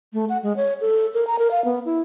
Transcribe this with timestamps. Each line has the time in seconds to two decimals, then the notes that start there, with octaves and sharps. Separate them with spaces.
0.13 A3
0.29 F#5
0.43 G#3
0.56 C#5
0.81 A4
1.14 A#4
1.27 A#5
1.39 A#4
1.51 F5
1.65 B3
1.85 E4